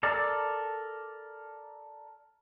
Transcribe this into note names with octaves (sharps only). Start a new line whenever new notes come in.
A4 A#4 D5